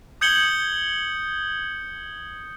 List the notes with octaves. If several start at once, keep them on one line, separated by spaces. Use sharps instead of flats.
D#6 G6 G#6 C#7 F#7 G7